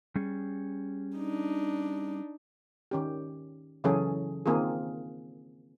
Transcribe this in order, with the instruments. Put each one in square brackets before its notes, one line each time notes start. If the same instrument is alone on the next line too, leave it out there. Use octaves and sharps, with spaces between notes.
[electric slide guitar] G3 C#4 G#4
[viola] D4 D#4
[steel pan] D#3 C#4 G4
C#3 E3 F#3 C#4 G#4 A4
D#3 A#3 C4 F4 G#4